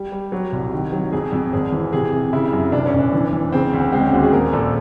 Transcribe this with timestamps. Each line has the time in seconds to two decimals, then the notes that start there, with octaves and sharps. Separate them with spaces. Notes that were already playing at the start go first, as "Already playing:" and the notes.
Already playing: G3 G4
0.12 G3
0.32 F#3 G4
0.52 C2
0.72 D#3
0.93 F#3
1.12 F2 G#4
1.33 F2
1.53 G#1 G#4
1.72 E3
1.93 C3 G#4
2.13 C3
2.33 C#3 E4
2.52 F#2
2.72 F1 D4
2.86 C#4
2.93 F1
2.99 D4
3.13 E3
3.33 E3
3.52 C#3 C4
3.73 D2
3.92 G#3 C4
4.03 C#4
4.13 D#2 F#4
4.23 G#4
4.33 A#2 A#4
4.53 A#1 A4